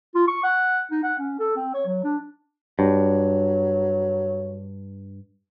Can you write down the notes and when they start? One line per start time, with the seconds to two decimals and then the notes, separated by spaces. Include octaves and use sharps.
0.15 F4
0.28 C#6
0.43 F#5
0.91 D#4
1.03 F#5
1.19 C#4
1.39 A4
1.56 C4
1.74 C#5
1.86 F#3
2.04 D4
2.79 G2 F#3